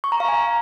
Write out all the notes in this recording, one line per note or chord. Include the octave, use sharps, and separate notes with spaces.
C#6
A#5
F5
G#5